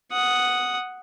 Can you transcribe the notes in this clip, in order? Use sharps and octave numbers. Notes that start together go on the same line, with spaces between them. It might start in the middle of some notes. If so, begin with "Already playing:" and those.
F#5 D#6